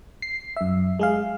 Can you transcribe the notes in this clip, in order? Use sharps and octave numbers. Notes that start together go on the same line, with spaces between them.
C7
F#2 E5
G#3 G#4 F5